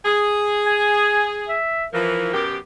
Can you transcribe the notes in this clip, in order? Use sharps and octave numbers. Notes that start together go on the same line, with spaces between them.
G#4
G#5
E5
E3 F3 A#4
F#2 B2 G4